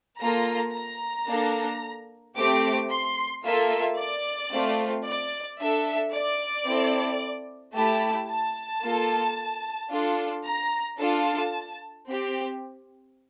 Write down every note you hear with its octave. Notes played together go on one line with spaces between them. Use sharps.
A#3 F4 A4 A#5
A#5
A#3 D4 A4
A3 C4 G4 D6
C6
A#3 F4 A4 E5
D5
A3 C4 F4
D5
D4 A4 E5
D5
C4 E4 A4
A3 E4 G4 A5
A5
A#3 F4 A4
D4 F4 A4
A#5
D4 F4 A4 A5
C4 G4